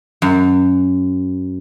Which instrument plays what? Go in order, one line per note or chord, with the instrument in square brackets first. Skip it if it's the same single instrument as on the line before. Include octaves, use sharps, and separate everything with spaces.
[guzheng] F#2